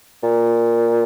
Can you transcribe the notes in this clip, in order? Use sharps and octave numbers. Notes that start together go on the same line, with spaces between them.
A#2